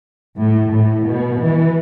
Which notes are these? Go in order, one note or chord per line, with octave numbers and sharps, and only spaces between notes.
A2
A2
B2
E3